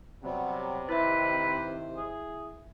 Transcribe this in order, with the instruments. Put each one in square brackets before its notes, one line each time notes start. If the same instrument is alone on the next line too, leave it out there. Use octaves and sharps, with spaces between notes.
[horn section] C3 [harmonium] F#3 G3 B3
[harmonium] D#3 C5 [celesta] E4 E5 [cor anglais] B4
[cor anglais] G#4